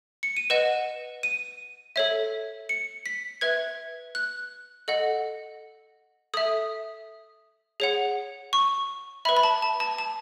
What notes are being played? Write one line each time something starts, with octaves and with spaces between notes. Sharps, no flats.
C#7
D#7
B4 D#5 F#5 E7
D#7
A4 C#5 E5
C#7
B6
B4 E5 G#6
F#6
A4 D#5 F#5
A4 E5 D#6
G#4 C#5 F#5
C#6
B4 E5 B5
B5
A5
A5
A5
A5